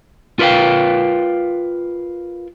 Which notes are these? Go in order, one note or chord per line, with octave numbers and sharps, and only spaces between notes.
F4 A#4 B4 C#5 F5 G5